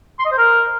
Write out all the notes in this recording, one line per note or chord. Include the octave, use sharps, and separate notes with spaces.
C6
D#5
C5
A#4